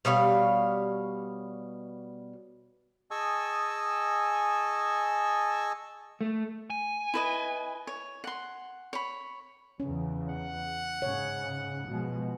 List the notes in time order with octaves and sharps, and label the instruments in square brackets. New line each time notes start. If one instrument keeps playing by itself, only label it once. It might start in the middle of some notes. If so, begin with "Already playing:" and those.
[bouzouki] B2 G3 C#5 F5
[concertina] G#4 D#5 G#5 A5 C#6 E6
[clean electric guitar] A3
[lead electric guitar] G#5
[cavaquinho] E4 B4 D#5
C#5
F#5 C6
C#5 B5
[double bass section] E2 C#3 [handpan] C#4
[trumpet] F#5
[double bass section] G#2 C#3 [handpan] C#5
[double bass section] B2 F3 G#3